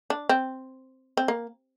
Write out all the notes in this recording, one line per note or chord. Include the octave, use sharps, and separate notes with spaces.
D4
C4
C4
A#3